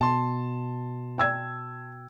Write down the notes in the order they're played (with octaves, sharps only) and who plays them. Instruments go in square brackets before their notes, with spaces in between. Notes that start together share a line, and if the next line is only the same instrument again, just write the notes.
[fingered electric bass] B2 [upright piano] A5 C6
[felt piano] G5 E6 G#6